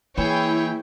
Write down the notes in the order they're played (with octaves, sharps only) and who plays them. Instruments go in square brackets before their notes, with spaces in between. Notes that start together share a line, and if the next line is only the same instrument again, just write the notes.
[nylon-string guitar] E3 [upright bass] A#3 [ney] E4 [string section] G#4 C#5 G5